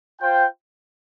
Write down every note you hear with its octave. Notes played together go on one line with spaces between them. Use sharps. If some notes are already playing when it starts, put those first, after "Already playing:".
F4 C5 G5